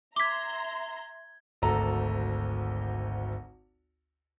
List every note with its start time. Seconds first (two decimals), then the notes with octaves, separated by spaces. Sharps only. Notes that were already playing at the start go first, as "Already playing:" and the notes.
0.16 E5 A#5 C6 D6 G#6 B6 G7
1.62 G#1 D2 A4 A#5